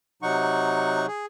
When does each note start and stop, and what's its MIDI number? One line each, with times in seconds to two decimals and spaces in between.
0.23 1.06 48
0.23 1.06 54
0.23 1.06 63
0.23 1.06 78
0.23 1.06 85
1.08 1.26 68